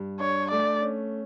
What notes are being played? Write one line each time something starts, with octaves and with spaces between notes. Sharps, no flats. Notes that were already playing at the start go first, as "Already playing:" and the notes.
Already playing: G2
D4 C#5
A3 D5
C#4